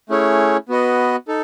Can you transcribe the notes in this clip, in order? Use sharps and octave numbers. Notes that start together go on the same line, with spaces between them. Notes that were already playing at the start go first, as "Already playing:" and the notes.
A3 C#4 E4 G#4 C#5
B3 F#4 B4 D#5
D#4 A4